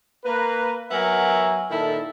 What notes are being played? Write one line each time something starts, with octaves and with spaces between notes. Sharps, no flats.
A#3 A#4 B4
F#3 B3 A#4 E5 G#5
A#2 D#3 E4 A4